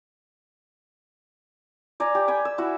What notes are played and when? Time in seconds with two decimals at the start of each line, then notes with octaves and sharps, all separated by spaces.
2.00 D5 G#5 A#5
2.15 G4
2.28 G5 G#5 B5
2.45 E6
2.58 E4 F#4